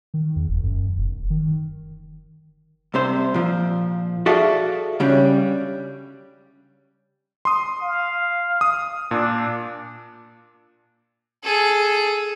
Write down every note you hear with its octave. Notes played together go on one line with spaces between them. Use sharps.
D#3
E2
F1
F#2
F1
D#3
C2 C3 C5
A#2 F3
F#4 G#4 A4 D5 E5 F5
C#3 G3 C#4 D4
C6 D#6
F5
D#6
A#2 D4
G#4 A4